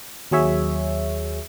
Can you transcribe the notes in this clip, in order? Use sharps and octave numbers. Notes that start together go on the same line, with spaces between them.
D#2 F#3 G#4 C#5 E5